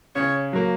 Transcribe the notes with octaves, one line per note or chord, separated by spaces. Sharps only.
C#3 C#5
F#3 A#3